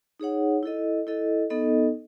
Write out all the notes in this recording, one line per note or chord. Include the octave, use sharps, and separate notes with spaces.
D#4 G#4 C#5 F#5
E4 A4 D#5
E4 A4 D#5
B3 D#4 A4 D#5